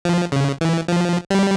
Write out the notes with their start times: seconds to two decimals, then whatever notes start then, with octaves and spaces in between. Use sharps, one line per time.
0.05 F3
0.32 C#3
0.61 E3
0.88 F3
1.30 G3